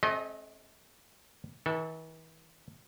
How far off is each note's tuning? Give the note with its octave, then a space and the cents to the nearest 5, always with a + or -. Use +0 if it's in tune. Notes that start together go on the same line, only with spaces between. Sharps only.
A3 -40 C4 +45 D#5 +0
E3 -40 A4 -10